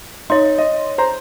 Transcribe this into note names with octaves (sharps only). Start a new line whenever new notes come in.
D#4 C#5 C6
D#5
C5 A#5